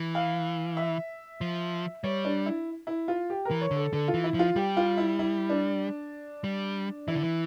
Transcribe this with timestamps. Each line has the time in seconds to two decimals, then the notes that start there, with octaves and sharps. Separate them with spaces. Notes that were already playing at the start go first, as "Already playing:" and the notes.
Already playing: E3
0.15 F5
0.77 E5
1.41 F3
2.04 G3 C#5
2.25 D4
2.46 E4
2.87 E4
3.08 F4
3.30 G4
3.45 A#4
3.51 E3
3.61 C#5
3.71 D3
3.76 A4
3.92 D3 A4
4.08 F4
4.14 E3
4.24 E4
4.34 F3 F4
4.56 G3 G4
4.77 F4
4.97 E4
5.19 E4
5.49 D4
6.44 G3
7.08 E3 E4
7.14 D3
7.23 E3